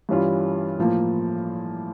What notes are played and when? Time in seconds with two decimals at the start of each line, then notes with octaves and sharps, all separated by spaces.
0.09 G2 E3 G3 C#4 F4
0.78 A2 F3 A#3